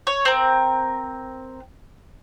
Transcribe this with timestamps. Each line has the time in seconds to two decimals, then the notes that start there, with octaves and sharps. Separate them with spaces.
0.07 C#5
0.25 C4 A#4